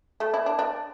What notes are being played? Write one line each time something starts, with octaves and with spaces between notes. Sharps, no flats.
A3
E4
D4
D4